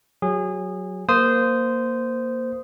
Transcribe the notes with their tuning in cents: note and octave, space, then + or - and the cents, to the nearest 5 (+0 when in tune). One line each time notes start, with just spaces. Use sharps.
F#3 +0 G#4 -25
A#3 +0 C5 -15 D#6 +0